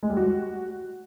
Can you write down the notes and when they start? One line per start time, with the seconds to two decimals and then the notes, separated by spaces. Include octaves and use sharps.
0.03 G#3
0.10 G3
0.17 F#4